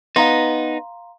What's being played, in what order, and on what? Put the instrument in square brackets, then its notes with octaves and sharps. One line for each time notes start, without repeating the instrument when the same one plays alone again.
[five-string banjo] B3 [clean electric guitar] D#4 [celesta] F5 A#5 C6